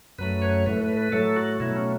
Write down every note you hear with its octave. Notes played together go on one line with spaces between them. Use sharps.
F#2 F#3 A3 B4
C#5
A2 A3 B4
B4
B4
A2 F#3 A3 A4
F#4
B2 F#3 A3 E4
C#4